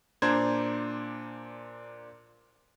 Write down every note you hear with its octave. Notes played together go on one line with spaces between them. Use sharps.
A#2 D4 C5 A#5 G#6